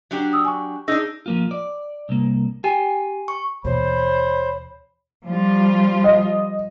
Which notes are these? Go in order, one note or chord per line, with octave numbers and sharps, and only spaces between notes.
F#3 D4 G4
D#6 E6
G#5 C#6
D4 D#4 G#4 E6 A#6
F3 A#3 F4
D5
C2 A#3
G4 G5 G#5
C#6
D#2 B2 E3 C5 C#5 B5
F3 G3 F4
D#5